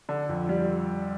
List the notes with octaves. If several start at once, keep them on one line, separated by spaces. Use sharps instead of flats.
D3
F2
G3